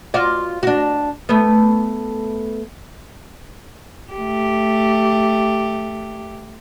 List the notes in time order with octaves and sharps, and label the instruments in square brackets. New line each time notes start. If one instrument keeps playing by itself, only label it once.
[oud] F4 F#4 D5
D4 F#4
A3 B3
[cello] A3 G4